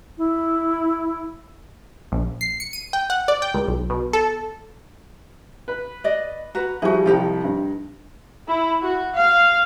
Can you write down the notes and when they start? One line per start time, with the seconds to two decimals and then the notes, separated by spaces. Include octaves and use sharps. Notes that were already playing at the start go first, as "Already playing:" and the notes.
0.18 E4
2.12 A#1
2.41 C7
2.60 C#7
2.73 D#7
2.93 G5
3.10 F#5
3.28 D5
3.42 G5
3.54 C#2
3.68 B1
3.90 B2
4.13 A4
5.68 B4
6.04 D5 D#5
6.55 F#4 B4 A#5
6.82 F3 G3 E4 F#4 G#4
7.06 C2 F3 D#4 G4 A4
7.44 G2
8.47 E4
8.81 F#4
9.15 F5